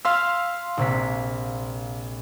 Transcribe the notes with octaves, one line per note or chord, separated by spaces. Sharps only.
F5 C6 E6 F6 B6
A#1 C3 B6